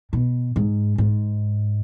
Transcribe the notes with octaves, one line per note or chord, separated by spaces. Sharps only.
B2
G#2
G#2